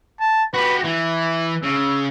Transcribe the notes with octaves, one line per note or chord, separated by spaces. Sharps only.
A5
F#4 G4 B4
E3 E4
C#3 E6